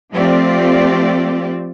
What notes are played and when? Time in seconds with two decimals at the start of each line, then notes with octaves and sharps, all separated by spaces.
0.11 F3 A3 C4 F4 G4 D5